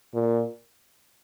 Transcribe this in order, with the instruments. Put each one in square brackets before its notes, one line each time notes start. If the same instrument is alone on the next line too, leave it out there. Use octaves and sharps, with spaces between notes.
[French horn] A#2